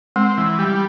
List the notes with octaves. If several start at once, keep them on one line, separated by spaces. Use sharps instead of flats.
G#3 C4
E3
G3